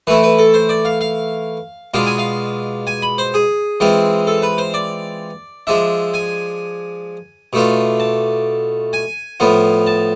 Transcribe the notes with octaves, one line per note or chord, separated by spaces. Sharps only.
E3 A3 E4 B4
B4
A4
C5
D5
F5
F5
B2 G#3 D4 F4 F5
G#5
F5
G#5
B5
C5
G#4
E3 G#3 C4 F4
A4
B4
C5
D5
F3 G#3 D4 E5
G#5
B2 A3 D4 F4
A5
G#5
A2 F3 B3 F4
A5